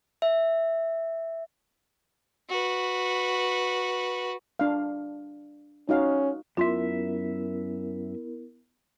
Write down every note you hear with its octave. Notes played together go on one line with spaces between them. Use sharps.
E5
F#4 B4
D4 F5
C#4 D#4 F#4 F5
F#2 B3 E4 F4 A#4 E5 C6